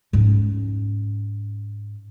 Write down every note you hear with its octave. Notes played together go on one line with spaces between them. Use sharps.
G#2 C#4